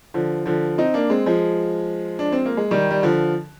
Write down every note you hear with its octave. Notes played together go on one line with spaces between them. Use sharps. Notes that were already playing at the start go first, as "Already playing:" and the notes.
D3 F3
D3 F3
C4 D#4
A#3 D4
G#3 C4
F3 G#3
D4
C4
A#3
G#3
D#3 G3
G3
D3 F3